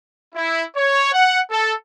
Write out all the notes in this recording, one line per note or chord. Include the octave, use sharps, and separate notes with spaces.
E4
C#5
F#5
A4